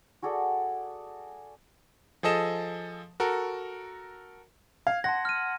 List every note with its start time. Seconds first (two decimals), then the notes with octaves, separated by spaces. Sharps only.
0.22 F#4 G#4 A4 D5
2.23 F3 G#4 A4 D#5 E7
3.20 F#4 A4 A#4
4.87 F5 G#6
5.04 F#5 A5 C6 A#6
5.25 F6 D#7